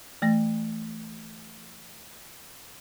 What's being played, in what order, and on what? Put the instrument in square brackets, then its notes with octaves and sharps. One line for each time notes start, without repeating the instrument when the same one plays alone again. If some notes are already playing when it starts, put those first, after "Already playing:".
[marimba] E3 A3 A#6